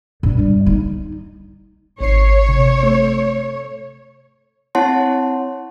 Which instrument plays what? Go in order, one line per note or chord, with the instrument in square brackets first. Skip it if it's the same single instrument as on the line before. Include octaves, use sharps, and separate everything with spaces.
[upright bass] G2
G3
D#4
[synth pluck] G#1 C7 [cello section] C#5
[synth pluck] C3
A3
[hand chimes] C4 E4 C#5 F#5 A5 C6